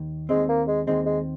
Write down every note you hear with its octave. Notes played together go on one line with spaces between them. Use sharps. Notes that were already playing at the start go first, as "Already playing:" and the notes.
Already playing: D#2 D#3
D#2 D#3 G#3 C4
A#3
G#3
D#2 D#3 G#3 C4
G#3